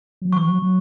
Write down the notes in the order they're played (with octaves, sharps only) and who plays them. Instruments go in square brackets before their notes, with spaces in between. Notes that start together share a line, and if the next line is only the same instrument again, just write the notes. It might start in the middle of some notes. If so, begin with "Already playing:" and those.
[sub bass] F#3
[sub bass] E3 [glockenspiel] C#6
[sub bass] F#3
F#3